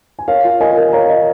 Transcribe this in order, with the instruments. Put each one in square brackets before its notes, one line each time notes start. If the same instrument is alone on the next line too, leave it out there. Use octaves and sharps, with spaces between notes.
[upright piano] G#5
[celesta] A#4 [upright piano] C#5 F5
[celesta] F4
[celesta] A#4 [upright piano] D#5 G#5
[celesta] A#4
[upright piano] C#5 F5 [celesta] A#5
[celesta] D#5